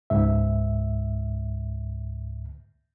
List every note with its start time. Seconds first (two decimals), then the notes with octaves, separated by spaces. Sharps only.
0.10 C#2 G#2 E5